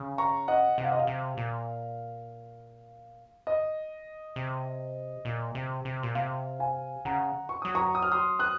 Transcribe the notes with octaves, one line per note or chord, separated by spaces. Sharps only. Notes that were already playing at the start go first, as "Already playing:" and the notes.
Already playing: C#3
A#5 C#6
D#5 F#5
C3 F#5
F5
D#5
F5
C3
A#2
D#5
C3
A#2
C3
C3
A#2
C3 F5
F5 G#5
C#3 F#5 A#5
C#6
F#3 D#6
A#5 C#6
D#6
F6
C6 D#6
D#6 F#6